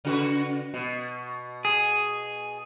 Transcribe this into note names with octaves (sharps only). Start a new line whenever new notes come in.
C#3 F#4 B4
B2
G#4